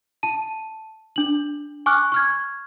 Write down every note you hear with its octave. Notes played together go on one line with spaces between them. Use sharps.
A5 D#7
D4 F#7
G#5 C#6 D6 F6 F#6
C#6 F6 G#6